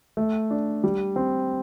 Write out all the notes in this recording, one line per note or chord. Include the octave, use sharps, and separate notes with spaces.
A3
D4
G3
C4